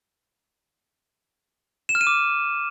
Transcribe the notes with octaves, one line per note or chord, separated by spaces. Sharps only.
E7
F6
D#7
D6